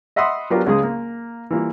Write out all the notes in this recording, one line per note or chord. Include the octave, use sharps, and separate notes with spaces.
D#5 E5 F#5 B5 C6 D#6
F#3 B3 D4 F4 G4 A#4
C#2 C#3 G#3 C#4 G#4 D#6
A#3
E3 G3 A#3 F4